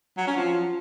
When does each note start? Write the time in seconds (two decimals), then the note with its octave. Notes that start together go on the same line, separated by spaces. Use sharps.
0.17 F#3
0.27 C#4
0.37 F3